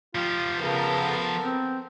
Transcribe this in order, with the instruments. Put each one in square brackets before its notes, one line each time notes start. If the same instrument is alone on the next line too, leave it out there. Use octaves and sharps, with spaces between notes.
[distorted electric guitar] F3 G4 [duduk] F4
[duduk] C#3 [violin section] B3 A4 A#4
[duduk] C4